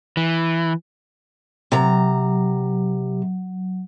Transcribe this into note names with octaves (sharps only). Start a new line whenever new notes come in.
E3
C3 F#3 A#5